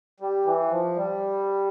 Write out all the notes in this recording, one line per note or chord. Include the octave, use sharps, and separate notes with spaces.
G3
E3
F3
G3